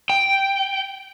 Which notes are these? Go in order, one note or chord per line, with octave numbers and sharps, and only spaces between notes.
G5